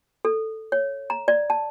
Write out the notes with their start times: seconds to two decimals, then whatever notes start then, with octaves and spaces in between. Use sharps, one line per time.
0.25 A4
0.72 C#5
1.10 A#5
1.28 D5
1.50 A5